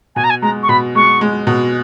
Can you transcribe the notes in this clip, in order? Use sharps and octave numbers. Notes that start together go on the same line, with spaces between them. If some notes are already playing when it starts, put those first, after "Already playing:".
B2 G#5
A#5
G#5
G#3 A#5
C#6
B2 B5
G#3 C#6
G#3
B2